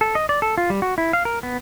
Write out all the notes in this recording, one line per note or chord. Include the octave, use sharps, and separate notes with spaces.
A4
D#5
D5
A4
F4
G3
F#4
E4
F5
A#4
B3